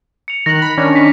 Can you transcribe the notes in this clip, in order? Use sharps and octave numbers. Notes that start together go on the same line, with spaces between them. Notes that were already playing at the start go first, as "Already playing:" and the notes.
C#7 F7
D#3 F#6 A#6
B5
D#3 C#4 D4
B6